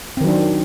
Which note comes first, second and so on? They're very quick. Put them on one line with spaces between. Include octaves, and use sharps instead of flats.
C4 D#3 F#3 D4